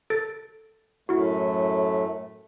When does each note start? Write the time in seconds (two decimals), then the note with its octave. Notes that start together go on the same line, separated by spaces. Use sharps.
0.10 A4 A6
1.09 F#2 A2 A3 E4 F#4